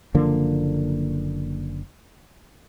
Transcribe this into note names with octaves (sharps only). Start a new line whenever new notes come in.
F#1 D3 F3 A#3